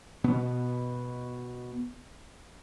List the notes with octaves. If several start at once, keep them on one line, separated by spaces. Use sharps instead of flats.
B2 B3